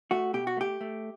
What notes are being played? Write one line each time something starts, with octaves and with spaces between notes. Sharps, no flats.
A3 F#4
B2 G4
F#4
A3 G4
A3